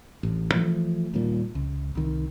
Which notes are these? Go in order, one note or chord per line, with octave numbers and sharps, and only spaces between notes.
A1
E3 F3 A3
D#1 D#2 A#2 G3
C#2
C2 D#3